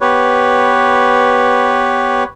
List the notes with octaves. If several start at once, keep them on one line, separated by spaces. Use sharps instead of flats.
B3 G4 B4 C#5